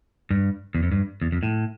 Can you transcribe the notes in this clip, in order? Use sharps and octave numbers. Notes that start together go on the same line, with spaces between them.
G2
E2
F2
G2
E2
F2
A2